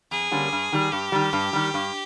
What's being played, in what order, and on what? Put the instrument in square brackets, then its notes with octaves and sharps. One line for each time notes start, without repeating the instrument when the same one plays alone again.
[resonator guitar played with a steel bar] F2 [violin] G#4
[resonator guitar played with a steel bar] D3 G3 A#3 C#4
G2
D#3 G3
[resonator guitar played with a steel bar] G2 [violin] G4
[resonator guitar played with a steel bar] D#3 G3
G2
D#3 G3
G2